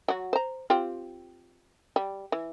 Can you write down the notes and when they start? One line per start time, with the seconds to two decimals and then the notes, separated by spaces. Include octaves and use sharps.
0.08 F#3 F#4
0.33 C5 A#5
0.70 C4 F4 G4
1.96 G3
2.32 E3